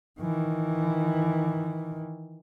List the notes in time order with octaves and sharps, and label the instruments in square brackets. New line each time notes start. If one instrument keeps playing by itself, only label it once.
[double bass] D#3 E3